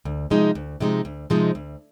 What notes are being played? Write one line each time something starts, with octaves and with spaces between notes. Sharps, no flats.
D2
C3 F3 G#3 D#4
D2
C3 F3 G#3 D#4
D2
C3 F3 G#3 D#4
D2